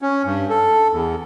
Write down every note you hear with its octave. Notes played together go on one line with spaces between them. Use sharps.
C#4
G2
A4
E2